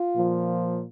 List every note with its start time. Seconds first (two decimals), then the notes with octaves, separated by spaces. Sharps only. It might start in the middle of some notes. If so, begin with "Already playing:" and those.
Already playing: F4
0.16 A#2 F3